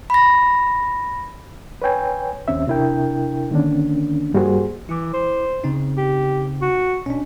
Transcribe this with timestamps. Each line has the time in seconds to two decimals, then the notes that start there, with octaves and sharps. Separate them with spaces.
0.10 B5 A#6
1.82 B4 C#5 G5 G#5
2.48 D#2 C4 C#4 E5
2.67 C3 D4 E4 A#4 G5
3.51 D3 D#3 A#3 C#4 D4
4.34 G2 G3 A#3 F#4 G#4 C5
4.89 E3 E4 D6
5.14 C5
5.64 C#3 C4 D#4
5.97 G4
6.62 F#4
7.06 B2 C#4 D4